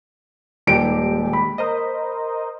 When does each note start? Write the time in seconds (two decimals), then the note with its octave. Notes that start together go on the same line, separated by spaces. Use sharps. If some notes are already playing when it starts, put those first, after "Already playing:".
0.67 D#1 D#3 G#3 G4 D7
1.33 B5
1.58 A#4 C5 D#5